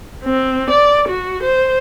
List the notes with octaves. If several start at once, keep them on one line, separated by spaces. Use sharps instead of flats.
C4
D5
F#4
C5